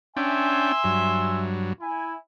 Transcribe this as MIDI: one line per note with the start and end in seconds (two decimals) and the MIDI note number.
0.17 0.72 61
0.17 0.72 62
0.17 1.42 76
0.17 0.72 79
0.17 1.42 80
0.17 1.42 84
0.84 1.73 43
0.84 1.73 54
1.80 2.11 64
1.80 2.11 80